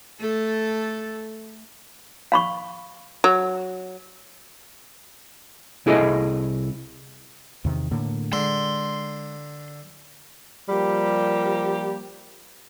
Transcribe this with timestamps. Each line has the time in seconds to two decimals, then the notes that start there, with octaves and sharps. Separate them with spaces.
0.20 A3 A4
2.32 F5 B5 C#6
3.24 F#3
5.86 C2 E4 G#4 A4 C#5 D#5
7.65 E2 C3 D#3
7.91 A2 D3 A#3
8.33 D3 G#3 C6
10.69 F3 G3 A#3 G4